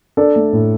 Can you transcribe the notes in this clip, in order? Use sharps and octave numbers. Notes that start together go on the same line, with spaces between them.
D4 A4 D5
A3
A2